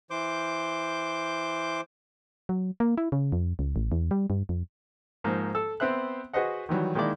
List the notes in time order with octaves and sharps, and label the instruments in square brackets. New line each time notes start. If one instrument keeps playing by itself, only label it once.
[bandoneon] E3 C5 D6 G6
[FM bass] F#3
A#3
E4
C#3
F2
C#2
A1
E2
G3
G2
F2
[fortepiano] G#2 F3 A#3
A4 E6
B3 C4 C5 E5 F#6
F#4 G#4 B4 C5 D#5 F#5
D#3 E3 F#3 G3
D#3 G#3 A#3 E4 D5